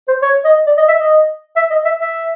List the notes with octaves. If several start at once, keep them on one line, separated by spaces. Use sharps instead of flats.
C5
C#5
D#5
D5
D#5
E5
D#5
E5
D#5
E5
E5